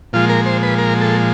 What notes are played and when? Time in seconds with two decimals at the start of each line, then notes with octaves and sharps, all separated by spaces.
0.13 A#2 F3 G#3 F4
0.29 A#4
0.46 C5
0.63 B4
0.78 A#4
1.01 A4